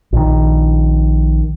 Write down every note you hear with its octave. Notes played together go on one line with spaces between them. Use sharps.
A#1 D#3